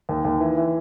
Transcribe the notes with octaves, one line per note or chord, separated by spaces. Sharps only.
D#2
D#2
E3
E3